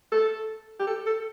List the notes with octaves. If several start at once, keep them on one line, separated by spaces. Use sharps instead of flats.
A4
G4
A4
A4